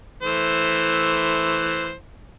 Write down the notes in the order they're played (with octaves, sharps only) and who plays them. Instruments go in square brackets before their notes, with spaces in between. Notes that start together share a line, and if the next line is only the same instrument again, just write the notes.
[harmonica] E3 A3 C5